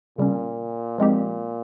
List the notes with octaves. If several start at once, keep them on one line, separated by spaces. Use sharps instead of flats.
A#2 C#3 G3 C#4
A#2 F3 G#3 C4 D#4 G4